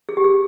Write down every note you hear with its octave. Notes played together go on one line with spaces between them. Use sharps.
G#4
G4
G#4